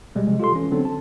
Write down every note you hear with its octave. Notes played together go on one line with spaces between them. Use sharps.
B2 G3 G#3
C3 F3 G3 G#3
F4 G4 A4 C6
E3 C#4
D3 F#3 B3 C4 D4 A4
A5